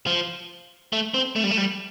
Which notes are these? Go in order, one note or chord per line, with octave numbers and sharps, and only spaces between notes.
F3
A3
C4
A3
G3
A3
G3